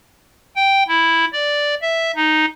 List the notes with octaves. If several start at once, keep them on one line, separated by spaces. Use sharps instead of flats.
G5
E4
D5
E5
D#4